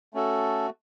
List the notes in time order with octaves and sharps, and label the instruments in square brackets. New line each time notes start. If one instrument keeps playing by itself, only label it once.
[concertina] A3 C#4 F#4 A4